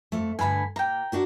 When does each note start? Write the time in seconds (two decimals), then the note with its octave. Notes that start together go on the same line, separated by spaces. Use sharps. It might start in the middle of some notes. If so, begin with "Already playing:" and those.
0.12 F2 A3
0.39 G2 D3 G#5 B5
0.76 A#2 G5 A#5
1.12 D4 F#4 A#4